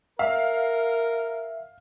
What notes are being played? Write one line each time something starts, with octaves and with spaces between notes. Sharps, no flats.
A#4 E5 F5